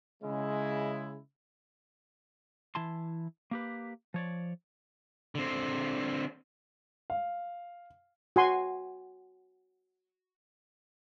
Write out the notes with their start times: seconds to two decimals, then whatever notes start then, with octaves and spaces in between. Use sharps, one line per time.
0.23 C#3 G#3 E4
2.75 E3 E4 A5 C6
3.51 A#3 G4 B4
4.14 F3 C#5 D5
5.35 D3 C4
7.10 F5
8.36 F#4 G#5 C6